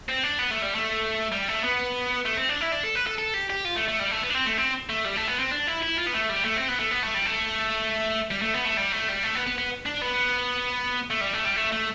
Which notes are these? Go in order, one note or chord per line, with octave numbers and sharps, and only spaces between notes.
C4
D4
B3
A3
G3
A3
G3
A3
B3
A3
C4
D4
E4
D4
A4
B4
A4
A4
G4
G4
F4
A3
A3
G3
A3
B3
D4
C4
A3
C4
A3
G3
A3
B3
C4
D4
E4
E4
F4
B3
A3
G3
A3
C4
B3
A3
B3
A3
G3
A3
G3
A3
B3
A3
G3
A3
G3
A3
B3
B3
B3
D4
B3
A3
G3
A3
G3
A3
A3